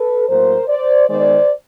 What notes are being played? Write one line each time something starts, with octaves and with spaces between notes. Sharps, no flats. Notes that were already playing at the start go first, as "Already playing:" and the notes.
Already playing: A4 B4
A2 F#3 A#3 A#4 C5
C5 D5
D#3 G#3 B3 C5 D5